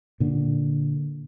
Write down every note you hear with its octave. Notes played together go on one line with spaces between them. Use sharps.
A#2 D3